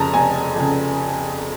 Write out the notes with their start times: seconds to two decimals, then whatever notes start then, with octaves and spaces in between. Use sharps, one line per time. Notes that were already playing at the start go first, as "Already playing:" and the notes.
Already playing: F1 F2 C#3 A5 A#5
0.14 F1 G#5
0.56 F2 C#3